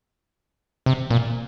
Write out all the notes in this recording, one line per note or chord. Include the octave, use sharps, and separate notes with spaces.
C3
A#2